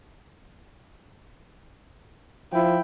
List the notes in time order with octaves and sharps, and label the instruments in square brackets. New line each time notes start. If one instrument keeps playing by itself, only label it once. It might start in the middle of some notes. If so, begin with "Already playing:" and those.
[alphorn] F3 [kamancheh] E4 G5